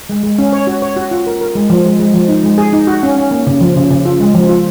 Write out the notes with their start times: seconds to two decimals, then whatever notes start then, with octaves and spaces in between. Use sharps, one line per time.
0.09 G#3
0.23 G#3
0.38 C#4
0.53 C#5
0.67 F#4
0.82 C#5
0.96 F#4
1.11 F4
1.27 A#4
1.41 A#4
1.55 G#3
1.70 F3
1.86 G#3
2.00 G#3
2.14 F3
2.28 D#4
2.43 G#3
2.58 G#4
2.73 D#4
2.87 F#4
3.03 C#4
3.16 C#4
3.31 A#3
3.47 C#3
3.61 F3
3.76 C#3
3.91 C#3
4.05 F4
4.20 G#3
4.34 F3
4.49 F4